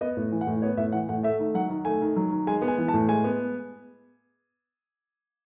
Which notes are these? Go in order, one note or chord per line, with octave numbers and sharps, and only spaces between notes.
B3 D#5
A2
E3
F#5
A2
B3 C#5
A2 E5
E3 F#5
A2 F#5
A3 E5
D#3
F#3 F#5
D#3
A3 G#5
D#3
F#3
D#3
G#3 G#5
B3
G#5
E3
A5
A2
G#3 G#5
B3